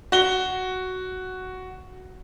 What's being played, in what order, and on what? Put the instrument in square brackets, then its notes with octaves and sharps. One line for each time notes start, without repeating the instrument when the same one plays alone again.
[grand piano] F#4 G7